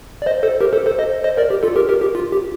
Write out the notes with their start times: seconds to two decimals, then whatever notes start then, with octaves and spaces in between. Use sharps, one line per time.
0.22 D5
0.26 C5 D#5
0.43 A4 C5
0.61 G4 A#4
0.73 A4 C5
0.86 A4 C5
0.99 C5 D#5
1.24 C5 D#5
1.37 A#4 D5
1.50 G4
1.63 F4 A4
1.76 G4 A#4
1.89 G4 A#4
2.02 G4
2.15 F4
2.32 G4